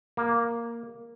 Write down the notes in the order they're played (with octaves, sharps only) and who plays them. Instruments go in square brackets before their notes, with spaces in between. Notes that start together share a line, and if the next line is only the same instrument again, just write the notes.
[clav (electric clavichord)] A#3